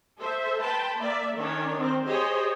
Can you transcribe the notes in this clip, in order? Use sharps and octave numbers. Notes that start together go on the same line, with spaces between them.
A4 C5 E5
B4 G5 A5 B5 C6
A#3 D5 E5
D#3 C#4 D4 C#5
D#3 C4 C5
G4 G#4 C5 C#5 D#5